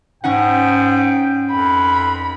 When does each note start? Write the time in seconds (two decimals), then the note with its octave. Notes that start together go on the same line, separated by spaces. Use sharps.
0.24 G#2 C#4 D#4 F#5 G5
1.51 F2 B5